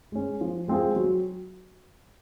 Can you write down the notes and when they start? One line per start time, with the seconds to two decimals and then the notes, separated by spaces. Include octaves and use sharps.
0.12 G#3 C#4
0.41 F3
0.68 G#3 C4 F4 G#4
0.96 F#3